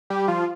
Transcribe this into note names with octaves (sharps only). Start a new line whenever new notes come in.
G3 G4
F3 F4